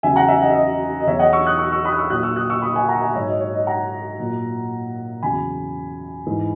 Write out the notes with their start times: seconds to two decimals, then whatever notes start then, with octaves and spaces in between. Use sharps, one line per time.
0.03 E2 C#3 F#3 E5 G#5
0.16 F#5 A#5
0.28 E5 G#5
0.42 D#5 F#5
0.50 E5
0.55 D#5
1.00 D#5
1.07 E2 B2 F#3 C#5 E5
1.19 D#5 F#5
1.33 C#6 E6
1.46 D#6 F#6
1.59 C#6 E6
1.72 C#6 E6
1.85 B5 D#6
1.92 F#6
1.97 C#6 E6
2.10 A#2 F#3 D#6 F#6
2.23 C#6 E6
2.36 D#6 F#6
2.50 C#6 E6
2.62 B5 D#6
2.76 E5 G#5
2.88 F#5 A#5
3.02 E5 G#5
3.14 G#2 F#3 C#5 E5
3.28 D#5
3.40 C#5
3.53 D#5
3.67 F#5 A#5
4.19 A#2 F#3
5.22 E2 C#3 F#3 G#5 B5
6.27 G#2 E3